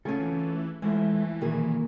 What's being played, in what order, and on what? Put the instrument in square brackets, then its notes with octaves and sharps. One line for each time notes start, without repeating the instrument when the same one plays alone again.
[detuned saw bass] C#3 [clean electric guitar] A3 F4 A4 [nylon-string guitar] C#4 G#4
[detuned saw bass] E3
[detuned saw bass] E3 [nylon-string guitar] F3 [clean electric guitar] G#3 A3 E4
[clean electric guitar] B1 D#3 F#3 [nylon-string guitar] A#2 A#3 G#4